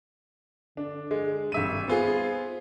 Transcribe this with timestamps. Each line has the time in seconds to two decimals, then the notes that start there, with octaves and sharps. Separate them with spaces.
0.77 D3 D4
1.11 G#3
1.52 G#1 G3 E5 D#7
1.88 B3 F4 G#4 C5